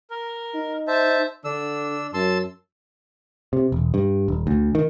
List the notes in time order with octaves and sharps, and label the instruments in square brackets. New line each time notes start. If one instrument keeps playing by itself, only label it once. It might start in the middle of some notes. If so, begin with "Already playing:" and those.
[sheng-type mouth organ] A#4
[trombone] D#4
[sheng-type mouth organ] C5 E5 A5
[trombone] D3 [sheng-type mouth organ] D4 E6
[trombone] F#2 [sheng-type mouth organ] A5 C6 E6
[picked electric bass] C3
E1
G2
D#1
D2
D#3